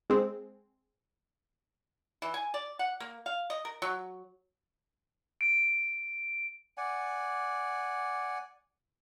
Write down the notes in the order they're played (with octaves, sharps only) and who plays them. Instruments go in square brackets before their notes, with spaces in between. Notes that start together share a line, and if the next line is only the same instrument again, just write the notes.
[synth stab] G#3 C4
[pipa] E3
G#5
D5
F#5
A#3
F5
D#5
A#4
F#3
[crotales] D7
[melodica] D5 F#5 G#5